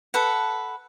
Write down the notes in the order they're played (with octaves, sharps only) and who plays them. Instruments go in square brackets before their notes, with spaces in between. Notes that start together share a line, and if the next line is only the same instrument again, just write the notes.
[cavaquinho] A4 B4 F#5